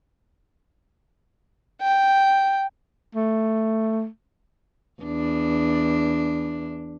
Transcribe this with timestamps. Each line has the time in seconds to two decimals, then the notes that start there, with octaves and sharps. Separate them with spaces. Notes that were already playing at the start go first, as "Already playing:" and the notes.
1.82 G5
3.15 A3
5.02 E2 D4